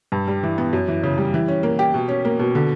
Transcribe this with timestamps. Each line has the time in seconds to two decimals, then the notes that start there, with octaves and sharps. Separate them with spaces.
0.12 G2
0.28 G3
0.43 E3
0.58 B3
0.73 F#2
0.88 E3
1.03 C#3
1.18 G3
1.34 E3
1.48 C#4
1.63 A#3
1.79 G4
1.94 B2
2.08 C#4
2.25 A#3
2.39 B2
2.55 D3